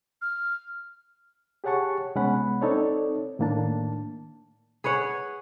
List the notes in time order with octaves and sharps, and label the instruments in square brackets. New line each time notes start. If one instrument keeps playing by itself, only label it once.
[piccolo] F6
[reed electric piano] G4 G#4 C#5 F#5 A5 C#6
C2 G#3 B3 C#4 F#5 B5
C4 D#4 A4 C#5 D5
A2 D#3 A#3 D4 A5
[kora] G#4 B4 C#5 F#5